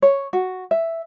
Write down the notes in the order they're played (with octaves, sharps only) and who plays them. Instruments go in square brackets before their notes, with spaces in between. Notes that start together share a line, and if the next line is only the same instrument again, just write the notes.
[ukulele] C#5
F#4
E5